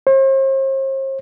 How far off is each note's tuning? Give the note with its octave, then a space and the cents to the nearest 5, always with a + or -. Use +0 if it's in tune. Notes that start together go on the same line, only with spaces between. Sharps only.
C5 +45